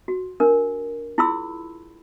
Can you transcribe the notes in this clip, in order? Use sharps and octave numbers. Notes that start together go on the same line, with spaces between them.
F#4
D4 A#4
E4 F4 G#4 B5 C6 E6